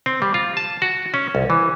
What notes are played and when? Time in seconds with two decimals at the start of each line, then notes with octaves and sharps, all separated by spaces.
0.06 C4
0.22 G3
0.34 F4
0.57 A5
0.82 F#4
1.14 C#4
1.35 C2
1.50 E3